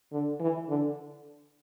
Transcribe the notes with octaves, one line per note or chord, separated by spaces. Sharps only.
D3
E3
D3